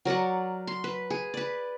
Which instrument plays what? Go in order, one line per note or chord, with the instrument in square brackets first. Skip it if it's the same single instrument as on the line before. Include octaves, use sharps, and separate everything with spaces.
[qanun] F#3 A#4 D5 F#5
C6
B4
G#4
B4 D5